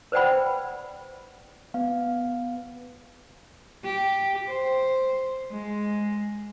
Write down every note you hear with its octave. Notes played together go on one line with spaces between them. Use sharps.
B4 C5 D5 F#5 G5 B5
B3 F5
G4
C5
G#3